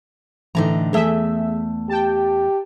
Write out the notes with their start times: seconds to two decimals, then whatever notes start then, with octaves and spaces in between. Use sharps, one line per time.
0.55 A2 D3 E3 D#4 A#5
0.93 E2 A3 G#4 E5
1.89 G4 G5 A5